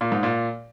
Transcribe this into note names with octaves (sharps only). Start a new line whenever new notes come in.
A#2
G#2
A#2